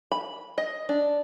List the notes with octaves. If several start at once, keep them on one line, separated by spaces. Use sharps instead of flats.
B5
D#5
D4